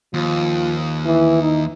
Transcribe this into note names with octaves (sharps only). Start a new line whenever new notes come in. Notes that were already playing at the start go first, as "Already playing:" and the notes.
D#2 F3
E3
D#4